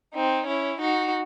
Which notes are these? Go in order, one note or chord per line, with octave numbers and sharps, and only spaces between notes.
C4 D#4
C#4 E4
D#4 F#4